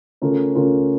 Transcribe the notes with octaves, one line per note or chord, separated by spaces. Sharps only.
C#3 A3 C#4 F4 A#4
C#3 A3 C#4 F4 A#4